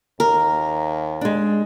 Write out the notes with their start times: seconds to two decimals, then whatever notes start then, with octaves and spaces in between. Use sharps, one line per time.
0.20 D#2 A#4
1.21 G#3 D4